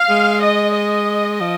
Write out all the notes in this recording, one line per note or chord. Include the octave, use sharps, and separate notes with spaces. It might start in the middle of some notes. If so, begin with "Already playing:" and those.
Already playing: F5
G#3
D#5
D#5
F3